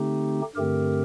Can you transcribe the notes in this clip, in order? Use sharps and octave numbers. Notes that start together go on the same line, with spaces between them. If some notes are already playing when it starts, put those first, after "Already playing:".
Already playing: D3 A3 C4 D#4 G4
G2 D3 A3 C4 G4 A#4